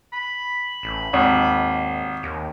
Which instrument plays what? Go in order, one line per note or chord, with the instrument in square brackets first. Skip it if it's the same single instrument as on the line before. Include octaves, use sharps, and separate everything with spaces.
[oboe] B5
[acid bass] A1
[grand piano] G#1 [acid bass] D#2
[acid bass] D#2